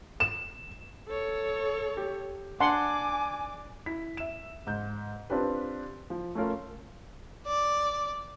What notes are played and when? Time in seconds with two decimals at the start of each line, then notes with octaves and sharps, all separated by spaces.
0.20 E7
1.08 A4 C#5
1.97 G4
2.60 D4 F#5 G#5 C6 D6
3.86 E4 B6
4.17 E5 E7
4.67 G#2 G6
5.30 C4 D4 F4 G4 B4
6.10 F3
6.35 A3 C#4 F4 A#4
7.47 D5